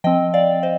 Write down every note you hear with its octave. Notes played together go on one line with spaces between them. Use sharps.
F3 C4 D#5 G5
D5 F5
C5 D#5